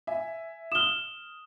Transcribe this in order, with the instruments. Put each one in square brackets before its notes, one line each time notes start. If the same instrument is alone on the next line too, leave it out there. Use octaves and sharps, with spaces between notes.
[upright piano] E5 G#5
[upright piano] D#6 F6 [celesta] E7 G7